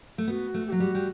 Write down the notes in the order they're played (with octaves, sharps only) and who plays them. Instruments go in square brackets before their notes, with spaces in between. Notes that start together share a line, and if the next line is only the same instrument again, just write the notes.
[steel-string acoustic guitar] A3
[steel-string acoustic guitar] B3 [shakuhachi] F#4
[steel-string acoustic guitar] A3
[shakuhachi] G4
[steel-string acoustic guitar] F#3 [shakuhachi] F#4
[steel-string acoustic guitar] G3
G3